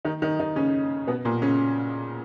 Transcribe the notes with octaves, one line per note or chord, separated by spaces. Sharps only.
D#3 D#4
D#3 D#4
D#3 D#4
C#3 C#4
B2 B3
A#2 A#3
C#3 C#4